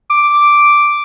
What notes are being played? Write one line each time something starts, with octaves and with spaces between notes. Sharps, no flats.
D6